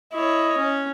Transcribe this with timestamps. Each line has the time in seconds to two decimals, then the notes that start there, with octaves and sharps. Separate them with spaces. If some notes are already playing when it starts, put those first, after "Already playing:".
0.13 E4 C#5 D#5
0.58 C#4